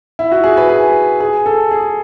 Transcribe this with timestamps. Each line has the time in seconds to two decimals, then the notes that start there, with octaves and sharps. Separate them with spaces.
0.19 E4
0.31 F#4
0.44 G#4
0.57 B4
0.69 G#4
1.20 G#4
1.46 A4
1.71 G#4